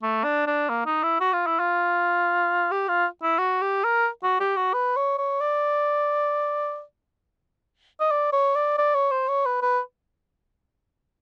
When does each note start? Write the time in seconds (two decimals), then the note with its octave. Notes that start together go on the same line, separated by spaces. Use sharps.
0.02 A3
0.24 D4
0.47 D4
0.69 A#3
0.86 D#4
1.03 E4
1.20 F#4
1.33 F4
1.46 E4
1.59 F4
2.71 G4
2.88 F4
3.22 E4
3.39 F#4
3.62 G4
3.84 A#4
4.23 F#4
4.40 G4
4.56 F#4
4.74 B4
4.96 C#5
5.18 C#5
5.41 D5
8.00 D#5
8.11 D5
8.33 C#5
8.55 D5
8.78 D5
8.95 C#5
9.11 C5
9.28 C#5
9.45 B4
9.62 B4